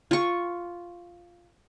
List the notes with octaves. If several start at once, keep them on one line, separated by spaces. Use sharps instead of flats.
F4 C#6